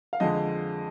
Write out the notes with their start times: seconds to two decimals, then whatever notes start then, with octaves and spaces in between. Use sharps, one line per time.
0.13 F5
0.20 F2 D3 G#3 D#5